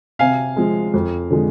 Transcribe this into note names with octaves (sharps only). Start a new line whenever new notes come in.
C3 F5 G#5
F3 G#3
F2
D3 F3 G#3